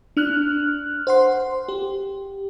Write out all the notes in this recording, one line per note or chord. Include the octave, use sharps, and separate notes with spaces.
D4 F6 F#6
C5 F#5 C6
G4